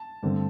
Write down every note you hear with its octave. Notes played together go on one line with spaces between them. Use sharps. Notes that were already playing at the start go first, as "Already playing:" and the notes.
Already playing: A5
G2 D3 A3 C4